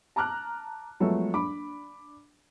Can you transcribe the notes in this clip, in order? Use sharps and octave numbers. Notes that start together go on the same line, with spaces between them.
A5 A#5 D6 F6 F#6
F3 F#3 G#3 A3 B3 A4
D4 B5 D6